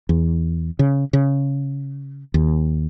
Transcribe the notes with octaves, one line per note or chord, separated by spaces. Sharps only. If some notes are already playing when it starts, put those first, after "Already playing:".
E2
C#3
C#3
D#2